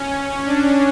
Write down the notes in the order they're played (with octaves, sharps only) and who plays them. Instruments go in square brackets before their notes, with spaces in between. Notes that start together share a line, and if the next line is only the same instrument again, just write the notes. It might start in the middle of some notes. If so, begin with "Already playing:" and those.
Already playing: [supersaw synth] C#4
D4